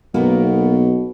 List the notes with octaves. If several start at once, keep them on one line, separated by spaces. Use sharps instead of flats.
B1 B2 A#3 B3 A#4